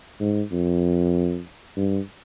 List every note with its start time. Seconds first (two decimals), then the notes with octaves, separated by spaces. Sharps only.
0.20 G#2
0.51 F2
1.77 G2